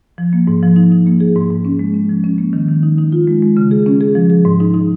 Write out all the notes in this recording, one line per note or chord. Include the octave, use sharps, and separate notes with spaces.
F3
A#3
G#2
F3
D#4
D#4
A#3
G#4
G#2
G#2
C#4
G#3
C#4
F3
C#4
A#3
D#3
D#3
D#4
D#4
F4
G#3
G#3
C#3
G#4
C#4
G#4
F3
G#4
G#2
D#4
D#4